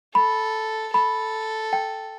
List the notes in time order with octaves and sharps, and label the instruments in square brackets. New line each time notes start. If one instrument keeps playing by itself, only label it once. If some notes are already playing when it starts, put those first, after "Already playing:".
[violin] A4 [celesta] B5
[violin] A4 [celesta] B5
[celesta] G5